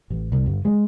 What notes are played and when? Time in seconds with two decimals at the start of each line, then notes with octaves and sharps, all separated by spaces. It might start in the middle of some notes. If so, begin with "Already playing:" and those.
0.10 A1
0.32 C2
0.46 G1
0.65 G#3